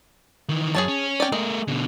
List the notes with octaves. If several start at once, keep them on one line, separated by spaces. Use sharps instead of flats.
D#3 E3
F#2 G#4 C#5 A5
C#4
D5 G5
G#3 A3 A#4
B2 D3